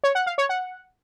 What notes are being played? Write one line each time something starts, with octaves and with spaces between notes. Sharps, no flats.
C#5
F#5
F5
C#5
F#5